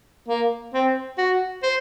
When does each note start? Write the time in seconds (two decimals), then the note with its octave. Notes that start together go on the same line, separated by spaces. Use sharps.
0.28 A#3
0.74 C4
1.18 F#4
1.63 C5